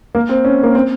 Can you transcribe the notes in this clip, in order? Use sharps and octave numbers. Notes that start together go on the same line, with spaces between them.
A#3
C4
C#4
A#3
C4